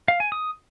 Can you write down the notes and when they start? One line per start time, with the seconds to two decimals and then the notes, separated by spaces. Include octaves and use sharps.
0.08 F5
0.20 G#5
0.32 D#6